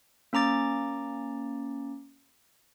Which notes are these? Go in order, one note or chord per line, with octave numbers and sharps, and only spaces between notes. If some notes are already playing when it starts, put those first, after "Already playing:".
A#3 C#4 A#5 D6 A6